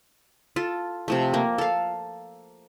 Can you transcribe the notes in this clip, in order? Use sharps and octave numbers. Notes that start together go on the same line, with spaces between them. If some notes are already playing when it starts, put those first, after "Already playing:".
F4 A4
C3 F3 A3
A#3
A4 F5